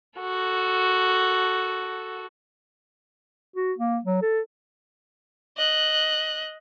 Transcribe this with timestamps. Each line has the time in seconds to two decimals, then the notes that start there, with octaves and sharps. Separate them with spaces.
0.20 F#4 A4
3.56 F#4
3.78 A#3
4.05 F#3
4.22 A4
5.57 D#5 F#6